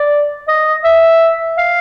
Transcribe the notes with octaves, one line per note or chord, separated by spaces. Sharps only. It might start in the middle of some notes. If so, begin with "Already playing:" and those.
Already playing: D5
D#5
E5
F5